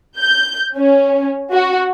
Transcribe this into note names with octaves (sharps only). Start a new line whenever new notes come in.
G6
C#4
F#4